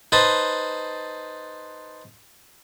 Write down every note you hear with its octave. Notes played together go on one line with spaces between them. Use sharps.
D#4 B4 C5 A5